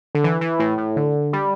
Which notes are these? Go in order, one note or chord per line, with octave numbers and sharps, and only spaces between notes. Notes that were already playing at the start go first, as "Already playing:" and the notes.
D3
E3
E3
A2
A2
D3
G3